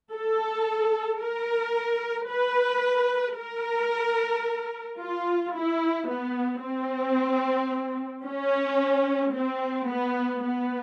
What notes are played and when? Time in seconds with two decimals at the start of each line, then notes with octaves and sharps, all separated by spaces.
0.13 A4
1.21 A#4
2.30 B4
3.38 A#4
5.00 F4
5.55 E4
6.09 B3
6.63 C4
8.26 C#4
9.34 C4
9.89 B3
10.43 B3